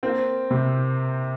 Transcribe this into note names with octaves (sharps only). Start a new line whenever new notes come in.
A#3 C4
C3